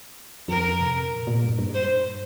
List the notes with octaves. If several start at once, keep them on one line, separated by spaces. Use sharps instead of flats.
F2 A#4
C3
A#2
A#2
G2
G2
C5